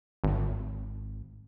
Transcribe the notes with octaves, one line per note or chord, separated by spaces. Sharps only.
G#1